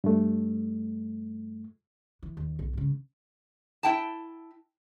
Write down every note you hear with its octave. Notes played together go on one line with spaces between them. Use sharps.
G2 A3
E3
D#2
B1
G#2 C#3
E4 G5 A5